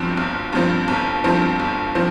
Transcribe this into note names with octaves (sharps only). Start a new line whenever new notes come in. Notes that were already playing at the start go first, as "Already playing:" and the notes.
Already playing: G1 G2 F3 C4
G1
G2 F3 C4
G1
G2 F3 C4
G1
F3 C4